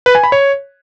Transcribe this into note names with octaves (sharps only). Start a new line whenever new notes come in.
B4
G#5
B5
C#5